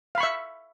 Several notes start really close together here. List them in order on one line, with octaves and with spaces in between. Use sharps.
F5 B5 C#6 E5